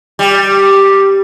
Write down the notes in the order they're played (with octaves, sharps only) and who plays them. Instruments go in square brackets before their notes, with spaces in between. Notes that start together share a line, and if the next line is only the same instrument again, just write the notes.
[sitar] G3